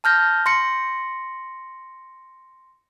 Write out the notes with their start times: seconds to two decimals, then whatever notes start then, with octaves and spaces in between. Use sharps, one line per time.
0.04 A5 F6 G6 A#6
0.46 C6 A#6 C#7